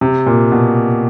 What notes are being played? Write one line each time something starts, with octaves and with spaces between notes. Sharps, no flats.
C3
A#2
B2